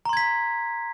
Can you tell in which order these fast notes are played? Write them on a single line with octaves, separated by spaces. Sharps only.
A#5 C6 G#6 B6